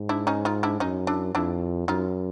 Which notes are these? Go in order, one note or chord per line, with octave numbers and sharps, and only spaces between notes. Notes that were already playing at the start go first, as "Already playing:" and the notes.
Already playing: G#2
D4 E4
C#4 D#4
D#4 F4
D4 E4
F#2 C#4 D#4
D4 E4
F2 D4 E4
F#2 D#4 F4